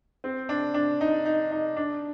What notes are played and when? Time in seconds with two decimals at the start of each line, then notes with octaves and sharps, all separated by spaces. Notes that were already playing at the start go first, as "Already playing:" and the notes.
0.24 C4
0.49 D4
0.74 D4
1.01 D#4
1.25 D#4
1.51 D#4
1.76 D4